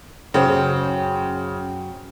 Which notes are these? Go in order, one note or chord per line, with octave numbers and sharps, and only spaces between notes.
F#2 C#3 C5 G5